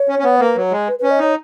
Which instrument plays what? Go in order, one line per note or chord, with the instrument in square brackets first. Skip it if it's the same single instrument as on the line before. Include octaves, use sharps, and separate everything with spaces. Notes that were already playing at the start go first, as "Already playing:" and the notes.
Already playing: [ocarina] C#5
[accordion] C#4
C#4
B3
[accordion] A#3 [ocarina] B4
[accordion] F#3
G#3
[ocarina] B4
[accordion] C#4 [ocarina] B4
[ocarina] D#5
[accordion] D#4 [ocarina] C#5